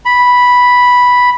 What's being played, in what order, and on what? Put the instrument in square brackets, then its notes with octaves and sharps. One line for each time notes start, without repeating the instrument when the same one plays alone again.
[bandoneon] B5